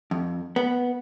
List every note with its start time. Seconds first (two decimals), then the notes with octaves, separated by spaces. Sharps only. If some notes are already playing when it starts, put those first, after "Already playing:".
0.11 F2
0.56 B3